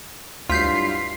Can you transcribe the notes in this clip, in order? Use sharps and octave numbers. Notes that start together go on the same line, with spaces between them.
D2 G2 F#3 E4 F4 G6 B6 C7